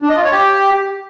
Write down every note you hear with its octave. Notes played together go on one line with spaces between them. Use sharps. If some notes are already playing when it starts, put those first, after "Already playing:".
D4
D#5
F4
C#5
G4